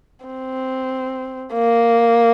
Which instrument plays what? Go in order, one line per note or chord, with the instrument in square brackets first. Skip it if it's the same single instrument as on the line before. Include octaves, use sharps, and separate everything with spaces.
[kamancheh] C4
A#3